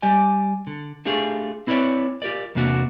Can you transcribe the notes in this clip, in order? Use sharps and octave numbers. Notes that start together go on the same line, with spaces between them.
G3 G4 D5 G#5
D3
A3 D4 F4 G4 G#4
C4 E4 B4 C#5 D5
F4 G4 A#4 D5
E2 C3 A#3 D4 F#4